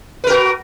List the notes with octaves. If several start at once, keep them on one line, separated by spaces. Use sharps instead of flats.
F#4 A#4 B4